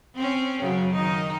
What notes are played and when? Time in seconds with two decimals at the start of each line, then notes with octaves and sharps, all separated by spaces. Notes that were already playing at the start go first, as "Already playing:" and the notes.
0.15 C4 C#4
0.61 F#2 C#3 F#3
0.93 D#3 D#4